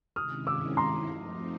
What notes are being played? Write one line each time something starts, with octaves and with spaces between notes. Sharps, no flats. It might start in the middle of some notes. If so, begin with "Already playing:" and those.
C3 D#3 G#3 C#4 E4 D#6 F6
D6 E6
A#5 C6
F3 A3 C4 D#4